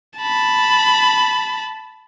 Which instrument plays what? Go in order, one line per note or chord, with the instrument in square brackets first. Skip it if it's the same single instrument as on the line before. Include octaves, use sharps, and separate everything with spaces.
[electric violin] A5 B5